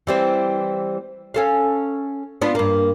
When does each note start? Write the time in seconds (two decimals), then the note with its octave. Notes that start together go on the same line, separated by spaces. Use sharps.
0.07 E3 G3 C4
1.34 C#4 A4 F5
2.42 B3 D4 F4
2.55 G2 A#3